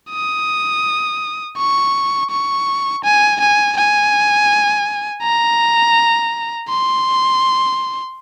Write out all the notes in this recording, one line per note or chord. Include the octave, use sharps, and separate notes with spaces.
D#6
C#6
C#6
G#5
G#5
G#5
A#5
C6